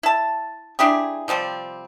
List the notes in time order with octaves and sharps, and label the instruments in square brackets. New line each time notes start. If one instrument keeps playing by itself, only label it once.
[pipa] E4 A5
D4 E4 G4 G#4
C3 F3 G3 C4